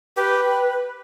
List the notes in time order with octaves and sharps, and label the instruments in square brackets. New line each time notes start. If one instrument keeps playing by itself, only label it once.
[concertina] G4 [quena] B4